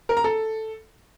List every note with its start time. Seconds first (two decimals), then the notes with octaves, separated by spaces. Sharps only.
0.09 A#4
0.17 A#5
0.24 A4